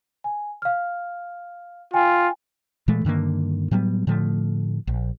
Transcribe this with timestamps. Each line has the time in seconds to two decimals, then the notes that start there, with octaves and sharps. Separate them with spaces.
0.24 G#5
0.62 F5 F6
1.94 F4 G5 G#5
2.88 A#2 E3 G#3 A3
3.05 G2 D3 D#3 A#3
3.71 A2 F#3 G3 B3
4.07 A2 D3 F3 A3
4.87 A#1